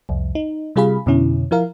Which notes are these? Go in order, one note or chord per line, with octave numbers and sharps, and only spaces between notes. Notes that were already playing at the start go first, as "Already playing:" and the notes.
C2 F2
D#4
C3 G3 F4 G#4 F5 B5
F2 B2 D3 C#4 E4
F3 E4 A#4 F5